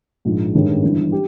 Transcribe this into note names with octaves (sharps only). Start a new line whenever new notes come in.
A#1 G#2 F3 G#3
A1 G2 D#3 G#3 C#4
G1 G2 E3
G4